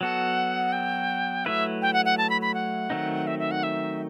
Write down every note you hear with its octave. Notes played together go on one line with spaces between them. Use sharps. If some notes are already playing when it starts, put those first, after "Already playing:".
F#3 B3 F#4 A4 F#5
G5
F#3 A3 E4 B4 E5
G5
F#5
F#5
A5
B5
B5
F#5
D#3 F#3 A3 C4 D#4
E5
E5
F#5
E5